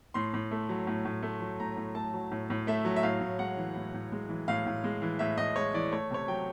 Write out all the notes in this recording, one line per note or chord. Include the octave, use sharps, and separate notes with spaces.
A2 C6
A2
A3
F#3
A2
A2
A3
F#3
A2 A#5
A2
A3 A5
F#3
A2
A2
A3 E5
F#3
E5
A2 F5
A2
G#3 F#5
E3
A2
A2
G#3
E3
A2 F5
A2
G#3
E3
A2 E5
A2 D#5
G#3 C#5
E3 D5
A3 C#5
C3 C#5
F#3 G5